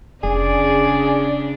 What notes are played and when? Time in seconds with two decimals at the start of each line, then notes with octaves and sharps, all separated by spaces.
0.24 F1 C#3 D4 G#4 D5